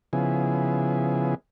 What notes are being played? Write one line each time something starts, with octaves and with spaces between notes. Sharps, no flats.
C#3 F3 B3 E4 G#4